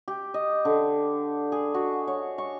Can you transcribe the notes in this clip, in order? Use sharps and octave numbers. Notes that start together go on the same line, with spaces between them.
G4
D#5
D3
G#4
F#4
C#5
C#6